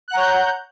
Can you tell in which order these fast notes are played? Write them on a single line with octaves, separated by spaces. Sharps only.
F#6 F#5 A#5 C#5 G6